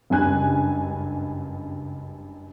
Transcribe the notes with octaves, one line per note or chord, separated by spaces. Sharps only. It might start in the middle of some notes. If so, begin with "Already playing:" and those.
F#1 C#2 G2 G#5 F#6